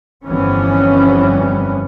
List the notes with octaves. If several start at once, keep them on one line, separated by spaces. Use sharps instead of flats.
G1 F2 E3 G3 B3 C#4